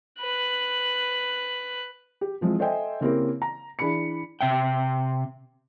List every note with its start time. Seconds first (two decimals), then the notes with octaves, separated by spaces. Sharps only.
0.20 B4 F#6
2.21 G4
2.41 E3 F3 G#3 C4
2.59 A4 C5 D#5 E5 G5 G#5
3.01 C#3 A#3 C4 E4 G4 A#4
3.42 A#5
3.79 E3 D4 G#4 B5 C#7
4.41 C3 E5 G5